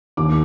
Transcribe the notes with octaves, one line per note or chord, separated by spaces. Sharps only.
D#2 D6